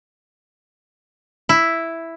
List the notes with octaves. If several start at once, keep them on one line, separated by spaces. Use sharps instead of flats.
E4